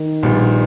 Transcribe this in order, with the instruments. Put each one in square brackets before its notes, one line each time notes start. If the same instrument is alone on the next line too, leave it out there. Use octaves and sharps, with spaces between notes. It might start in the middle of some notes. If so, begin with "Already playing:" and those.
Already playing: [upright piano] D#3
[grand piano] A#1 A#2 G3 B3